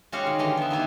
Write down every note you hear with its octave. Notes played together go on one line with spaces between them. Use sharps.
G#3 C#4 F#4 G4 F5 F#5
D#3
D3 E3 G4 D#5 F5
B3 E5
D#3 A#3 B3 E4